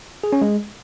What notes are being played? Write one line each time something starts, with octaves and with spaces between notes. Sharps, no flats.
G#4
C#4
G#3